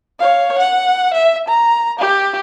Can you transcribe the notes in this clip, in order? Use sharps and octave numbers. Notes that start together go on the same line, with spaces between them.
C#5 F5
F#5
E5
A#5
G4